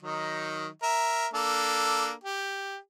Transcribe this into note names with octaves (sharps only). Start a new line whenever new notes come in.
D#3 F#3 D#4
A#4 E5
A#3 D4 A4
G4